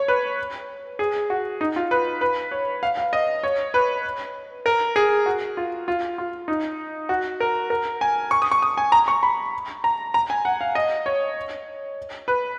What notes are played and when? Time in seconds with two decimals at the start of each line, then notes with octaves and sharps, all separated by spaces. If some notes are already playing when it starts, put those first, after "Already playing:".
Already playing: C#5
0.08 B4
0.99 G#4
1.30 F#4
1.61 D#4
1.76 F4
1.91 B4
2.21 B4
2.51 C#5
2.83 F5
2.98 F5
3.13 D#5
3.43 C#5
3.74 B4
4.66 A#4
4.96 G#4
5.26 F#4
5.57 F4
5.88 F4
6.18 F4
6.48 D#4
7.09 F#4
7.40 A#4
7.70 A#4
8.01 G#5
8.31 C#6
8.42 D#6
8.51 C#6
8.62 D#6
8.77 G#5
8.92 A#5
9.08 C#6
9.23 B5
9.84 A#5
10.14 A#5
10.30 G#5
10.45 F#5
10.61 F5
10.75 D#5
11.06 C#5
12.28 B4